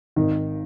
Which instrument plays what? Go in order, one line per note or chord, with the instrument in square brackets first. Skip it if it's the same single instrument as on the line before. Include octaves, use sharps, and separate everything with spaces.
[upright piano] G#1 [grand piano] D#3